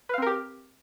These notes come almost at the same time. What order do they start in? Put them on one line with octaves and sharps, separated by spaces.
B4 F5 C4 A#4 G4